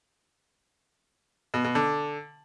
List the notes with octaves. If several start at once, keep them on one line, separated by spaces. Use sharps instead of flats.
B2
B2
D3